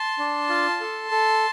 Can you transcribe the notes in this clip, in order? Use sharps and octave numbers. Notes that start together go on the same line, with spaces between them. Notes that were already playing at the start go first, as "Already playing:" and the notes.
Already playing: A5 C6
D4
F4
A4
A4